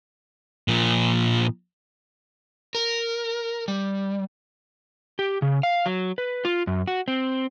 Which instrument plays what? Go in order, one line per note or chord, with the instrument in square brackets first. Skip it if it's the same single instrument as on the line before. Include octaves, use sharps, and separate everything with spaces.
[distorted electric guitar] A#2 F3
[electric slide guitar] A#4
G3
G4
C#3
F5
F#3
B4
F4
F#2
F#4
C4